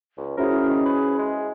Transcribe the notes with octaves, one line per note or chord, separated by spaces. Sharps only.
C#2
C#4 E4 F#4 G#4 A#4 C5
D#3
B4
G#3